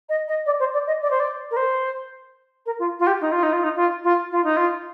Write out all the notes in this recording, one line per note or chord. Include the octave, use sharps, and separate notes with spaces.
D#5
D#5
D5
C5
D5
D#5
D5
C5
D5
A#4
C5
A#4
F4
F4
G4
D#4
F4
D#4
F4
D#4
F4
F4
F4
D#4
F4